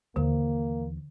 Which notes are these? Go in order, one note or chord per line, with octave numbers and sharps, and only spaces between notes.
D#2 D3 E3 A#3